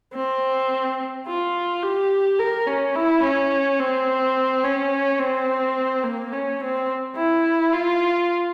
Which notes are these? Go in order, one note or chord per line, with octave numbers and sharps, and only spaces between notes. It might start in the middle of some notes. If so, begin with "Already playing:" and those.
C4
F4
G4
A#4
C#4
E4
C#4
C4
C#4
C4
A#3
C#4
C4
E4
F4